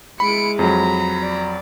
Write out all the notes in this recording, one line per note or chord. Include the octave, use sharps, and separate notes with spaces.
G#3 E4 B5 C#7 D7
F2 F#3 A#5 B5
D5